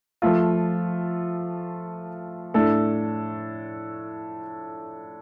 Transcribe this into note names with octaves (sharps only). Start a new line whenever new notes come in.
F3 A3 F4
A2 A3 D4 A4